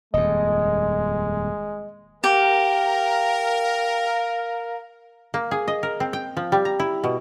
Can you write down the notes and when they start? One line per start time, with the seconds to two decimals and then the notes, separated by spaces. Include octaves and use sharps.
0.14 D#1 F2 G#3 D#5
2.24 G4 A#4 F5
5.34 A#3
5.51 G#4
5.68 D#5
5.83 A#4
6.00 C4
6.13 G5
6.37 F3
6.52 G3
6.65 A#5
6.79 E4
7.04 B2